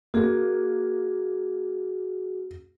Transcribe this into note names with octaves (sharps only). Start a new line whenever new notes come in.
A#3 F#4 G#4